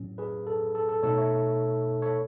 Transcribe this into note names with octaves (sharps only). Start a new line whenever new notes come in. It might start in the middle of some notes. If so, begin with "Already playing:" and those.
Already playing: A2 F#3 C#4
G#4 B4
A4
A4
A4
B2 A3 D#4 A4 C#5
C#5 E5
A4 C#5